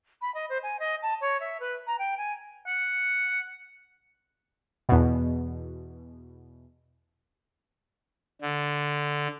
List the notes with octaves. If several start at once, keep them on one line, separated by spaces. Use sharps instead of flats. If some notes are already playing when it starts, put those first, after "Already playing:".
B5
D#5
C5
G#5
D#5
A5
C#5
E5
B4
A#5
G5
G#5
F#5
E2 B2
D3